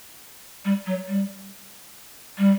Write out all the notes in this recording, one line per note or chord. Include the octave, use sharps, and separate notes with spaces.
G3
F#3
G3
G3